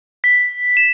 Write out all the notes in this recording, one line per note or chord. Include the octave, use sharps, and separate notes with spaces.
B6
E7